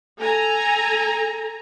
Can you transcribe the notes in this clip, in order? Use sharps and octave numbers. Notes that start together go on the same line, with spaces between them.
A4 G#5 A#5